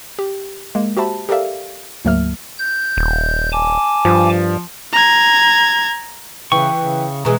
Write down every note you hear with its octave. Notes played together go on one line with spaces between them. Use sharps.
G4
G#3 A#3
F#4 G4 C5 E5 A5 B5
G4 A4 A#4 D5 E5 F5
D2 G#2 F#3 A#3 E5 F6
G6
D#1
G#5 A5 D6
G2 F3
A#5 G#6
C#3 E3 G5 C#6
C#3
B2 E3 G#3 G#4 A#5